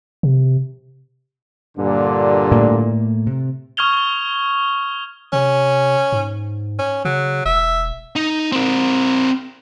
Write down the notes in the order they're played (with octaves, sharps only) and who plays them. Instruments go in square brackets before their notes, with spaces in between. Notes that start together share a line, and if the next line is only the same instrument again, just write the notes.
[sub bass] C3
[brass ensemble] G2 A#2 D3
[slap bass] A2 A3 A#3
C3
[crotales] C#6 D#6 F6 G#6 F7 G7
[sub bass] C3 [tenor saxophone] C#4
[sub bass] G#2
[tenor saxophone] C#4
[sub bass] C#3 [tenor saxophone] F#3
[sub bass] E1 [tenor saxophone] E5
[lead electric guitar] D#4
C4 A#4